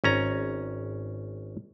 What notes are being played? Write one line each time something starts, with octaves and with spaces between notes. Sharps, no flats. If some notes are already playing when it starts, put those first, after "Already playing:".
G#1 C#4 A#5